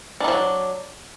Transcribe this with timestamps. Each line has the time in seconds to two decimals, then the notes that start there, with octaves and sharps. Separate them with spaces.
0.20 D4
0.24 D#3
0.28 F3
0.32 F#3